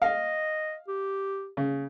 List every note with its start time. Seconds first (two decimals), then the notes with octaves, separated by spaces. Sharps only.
0.02 D#5 F5
0.88 G4
1.57 C#3